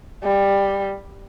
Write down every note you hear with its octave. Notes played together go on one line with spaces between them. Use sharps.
G3